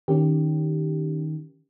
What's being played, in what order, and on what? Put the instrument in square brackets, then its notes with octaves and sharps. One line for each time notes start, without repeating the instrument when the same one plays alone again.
[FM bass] D#3 [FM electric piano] C#4 G4